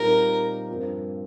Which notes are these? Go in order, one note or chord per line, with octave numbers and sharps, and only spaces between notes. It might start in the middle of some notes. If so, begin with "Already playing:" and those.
Already playing: A#2 G3 C4 D#4 G4 A#4
G2 F3 C4 F4 A#4